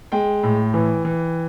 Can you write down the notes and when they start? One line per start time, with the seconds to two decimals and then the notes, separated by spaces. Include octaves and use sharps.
0.12 G#3 G5
0.43 A2
0.74 E3
1.05 E3